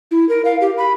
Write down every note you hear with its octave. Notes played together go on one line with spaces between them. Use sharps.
E4
A#4
F5
G4
B5